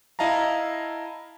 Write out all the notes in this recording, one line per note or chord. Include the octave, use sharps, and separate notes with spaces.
E4 D#5 F5 A5 A#5